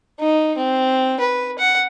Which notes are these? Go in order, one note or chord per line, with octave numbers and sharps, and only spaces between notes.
D#4
C4
B4
F#5